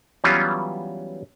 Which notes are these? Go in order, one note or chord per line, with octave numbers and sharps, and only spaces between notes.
E3 F#3 G3 B3 C#4 F4